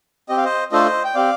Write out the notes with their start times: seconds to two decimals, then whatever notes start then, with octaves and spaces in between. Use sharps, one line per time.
0.29 C4 G4 D#5
0.37 F5
0.44 C5 D#5
0.72 A3 D4 F4 A4 C5 D#5
1.04 G5
1.15 C4 G4 D5 F5